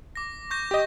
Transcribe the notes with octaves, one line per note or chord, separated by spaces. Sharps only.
D6 A#6
C#6 G6 A#6
G4 D#5